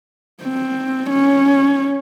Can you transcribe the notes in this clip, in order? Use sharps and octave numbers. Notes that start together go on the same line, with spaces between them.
C4
C#4